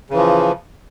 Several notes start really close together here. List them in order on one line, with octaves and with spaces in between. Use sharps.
C#3 E3 F3